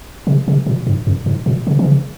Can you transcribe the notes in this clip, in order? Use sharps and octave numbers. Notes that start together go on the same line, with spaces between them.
C3
C3
A#2
G2
F2
G#2
A#2
C#3
E3
C#3